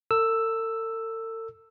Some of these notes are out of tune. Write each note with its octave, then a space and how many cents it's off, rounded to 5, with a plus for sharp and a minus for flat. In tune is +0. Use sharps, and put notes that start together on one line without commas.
A4 +45 E6 +5